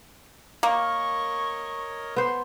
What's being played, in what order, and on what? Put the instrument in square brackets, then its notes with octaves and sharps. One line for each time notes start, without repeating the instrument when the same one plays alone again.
[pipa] A#3 [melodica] A#4 C#5 D#5 [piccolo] C#6
[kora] B3 C5 [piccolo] C6